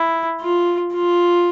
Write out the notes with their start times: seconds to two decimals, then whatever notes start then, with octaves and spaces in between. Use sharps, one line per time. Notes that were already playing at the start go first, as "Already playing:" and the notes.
Already playing: E4
0.41 F4
0.94 F4